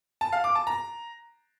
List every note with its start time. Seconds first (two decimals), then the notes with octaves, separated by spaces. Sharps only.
0.21 A5
0.32 F5
0.44 D6
0.55 A5
0.67 A#5